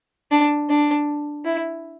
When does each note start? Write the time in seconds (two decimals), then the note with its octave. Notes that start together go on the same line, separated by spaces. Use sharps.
0.31 D4
0.69 D4
1.45 E4